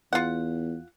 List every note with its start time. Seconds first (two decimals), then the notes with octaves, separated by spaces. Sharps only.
0.13 E2 F4 F#5